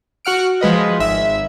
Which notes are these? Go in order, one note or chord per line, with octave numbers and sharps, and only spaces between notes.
F#4 F#5 F6 D7
F3 G#3 B4 D#5
G#1 E5